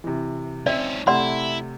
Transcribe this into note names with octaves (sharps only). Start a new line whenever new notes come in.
C3 E3
C4 C#4 D#4 D5 E5
C3 A3 E4 D5 F#5 C6